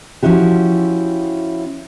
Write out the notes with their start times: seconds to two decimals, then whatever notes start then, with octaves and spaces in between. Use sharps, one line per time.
0.23 F3 C#4 E4 F#4 G4